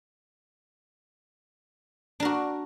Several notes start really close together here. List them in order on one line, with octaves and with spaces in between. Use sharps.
D4 A#4 F#4